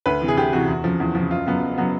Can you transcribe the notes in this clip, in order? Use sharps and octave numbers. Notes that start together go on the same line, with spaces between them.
D2 B4
C3 E3
G#4
D2 G4
C3 E3 F#4
E2
C#3 F3
E2
C#3 F3
F#1 F4
F#2 C#3 F#3 B3
F#1
C#3 F#3 B3